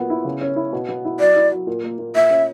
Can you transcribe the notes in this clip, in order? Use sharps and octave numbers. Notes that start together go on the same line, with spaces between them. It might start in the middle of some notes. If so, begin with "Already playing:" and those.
Already playing: A#2 F#3 B3
E4
C#3
C#4
E4
B2
B3
E4
F#3 D5
E4
F#3
A#2
A#3
A#2
A#2 E5
C#4